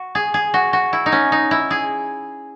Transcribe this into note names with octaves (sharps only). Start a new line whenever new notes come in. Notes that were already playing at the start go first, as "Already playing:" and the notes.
Already playing: F#4
G#4
G#4
F#4
F#4
E4
D#4
C#4
D#4
E4
G#4